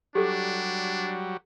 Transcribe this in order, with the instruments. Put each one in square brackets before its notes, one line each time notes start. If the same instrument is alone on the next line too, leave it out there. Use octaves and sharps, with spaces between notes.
[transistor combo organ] F#3 G3 [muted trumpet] D4 [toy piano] G4 A4 D6